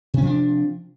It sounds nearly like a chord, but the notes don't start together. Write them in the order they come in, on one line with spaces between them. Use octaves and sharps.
C3 C#4 F3 D4